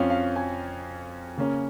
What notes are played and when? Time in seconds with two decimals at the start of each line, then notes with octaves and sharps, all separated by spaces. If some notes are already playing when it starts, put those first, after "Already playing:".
Already playing: F2 F3 C#4 F5
0.10 F5
0.36 G#5
1.37 C#3 A#3 C#4